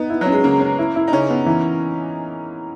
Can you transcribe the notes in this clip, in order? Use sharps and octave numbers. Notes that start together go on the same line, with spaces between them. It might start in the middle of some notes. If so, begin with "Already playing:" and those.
Already playing: B3 D#4
E4
F#3 C#4
G#3
C#3 A#3
C#4
E4
E4
D#4
C#3 C#4
B3
E3